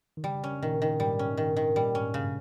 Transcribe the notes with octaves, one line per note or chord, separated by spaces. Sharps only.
D#3
C#3 G3
C#4
A#2 D#3
D#3
G#2 G3
C#4
D#3
D#3
A#2 G3
G#2 C#4
G2 C#3